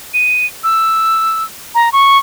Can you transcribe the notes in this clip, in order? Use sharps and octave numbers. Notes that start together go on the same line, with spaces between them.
D#7
E6
A#5
C#6